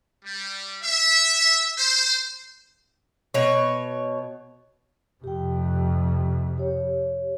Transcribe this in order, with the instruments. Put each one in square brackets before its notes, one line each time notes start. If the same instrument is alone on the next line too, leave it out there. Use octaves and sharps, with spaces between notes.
[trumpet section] G3
E5
C5
[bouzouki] B2 C#5
[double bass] F2 C3 [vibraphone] G4 G5
[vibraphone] G4 C#5